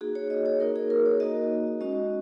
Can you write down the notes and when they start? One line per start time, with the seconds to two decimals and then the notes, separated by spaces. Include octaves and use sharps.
0.01 A#3 D#4 F#4 G#4
0.15 C#5
0.30 D#5
0.46 C#5
0.60 A#3 D#4 F#4 A#4
0.76 G#4
0.90 A#4
1.06 C#5
1.20 A#3 D#4 F#4 D#5
1.80 G#3 C#4 F#4 D#5